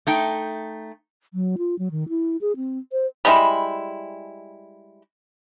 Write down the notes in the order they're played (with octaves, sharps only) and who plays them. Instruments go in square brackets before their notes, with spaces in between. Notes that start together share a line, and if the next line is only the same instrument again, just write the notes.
[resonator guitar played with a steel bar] A3 D#4 G5
[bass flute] F#3
F4
F#3
D#3
E4
G#4
C4
C5
[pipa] G3 G#3 E4